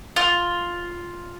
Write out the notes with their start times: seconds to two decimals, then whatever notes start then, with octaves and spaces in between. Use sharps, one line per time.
0.16 F4